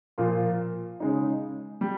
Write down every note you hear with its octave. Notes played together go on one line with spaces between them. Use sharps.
A#2 F3 A#3 F4
C#3 G#3 D#4
G3